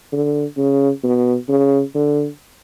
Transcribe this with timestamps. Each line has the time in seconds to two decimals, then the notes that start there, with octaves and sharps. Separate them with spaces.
0.12 D3
0.57 C#3
1.04 B2
1.49 C#3
1.95 D3